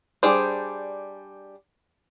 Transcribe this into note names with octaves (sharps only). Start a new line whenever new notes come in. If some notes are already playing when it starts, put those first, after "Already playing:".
G3 D4 G#4 C5